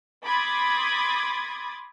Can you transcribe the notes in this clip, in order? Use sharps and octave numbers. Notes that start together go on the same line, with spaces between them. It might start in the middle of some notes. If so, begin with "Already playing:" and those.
B5 C6 D6 D#6 G#6 A6